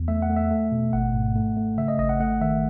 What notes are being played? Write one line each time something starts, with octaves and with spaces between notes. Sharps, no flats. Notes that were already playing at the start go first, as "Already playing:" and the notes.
Already playing: E2
A3 E5
F#5
A3
E5
A3
B2
G#1 F#5
G#2
A3
A3
C#3 E5
D#5
G#1 D#5
F#5
A3 F#5
D#3 E5